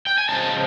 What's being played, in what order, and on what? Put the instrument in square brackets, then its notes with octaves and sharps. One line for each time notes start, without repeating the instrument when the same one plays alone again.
[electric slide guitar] G5
G#5
C#3 F3 G#3 C4 A5